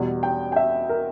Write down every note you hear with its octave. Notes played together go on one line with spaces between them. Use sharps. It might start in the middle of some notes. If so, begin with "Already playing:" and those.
Already playing: E2 B2 G3
G5
G5
E5
A#4